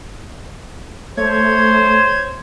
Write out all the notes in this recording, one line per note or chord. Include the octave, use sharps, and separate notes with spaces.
A3 C5 C#5 G#6